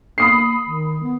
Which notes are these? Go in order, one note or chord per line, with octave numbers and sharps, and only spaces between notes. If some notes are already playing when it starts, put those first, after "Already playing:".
A#3 B5 D#6 C7
D#3
B3